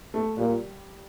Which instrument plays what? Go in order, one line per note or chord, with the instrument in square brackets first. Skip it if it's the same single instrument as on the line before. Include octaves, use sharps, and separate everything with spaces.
[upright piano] A3
[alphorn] A#2 [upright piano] G3